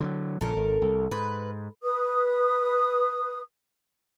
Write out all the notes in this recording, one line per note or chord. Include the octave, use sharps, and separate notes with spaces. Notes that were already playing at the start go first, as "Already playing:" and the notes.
D3 F3 F#3
A#1 A#2 C#3 A4 A#4
G#1
C2
G#2 B4
B4 D#6